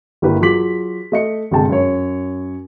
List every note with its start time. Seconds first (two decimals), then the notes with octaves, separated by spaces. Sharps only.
0.22 G1 A#3 E4 G4 B4
0.41 F#3 F4 G#4 D6 B6 F#7
1.12 A3 D#5 C#7
1.51 G1 C3 G#3 G#4 G5 A5
1.69 F#2 C#5